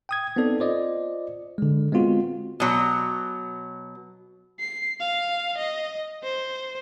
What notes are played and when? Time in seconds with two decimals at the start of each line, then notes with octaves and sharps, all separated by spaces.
0.09 G5 D#6 G#6
0.36 B3 C4 D#4 A4 D5
0.59 F4 C5 D5 D#5
1.58 D3 G#3
1.92 G#3 B3 C4 F4 F#4
2.60 B2 F#3
4.60 C7
5.00 F5
5.58 D#5
6.23 C5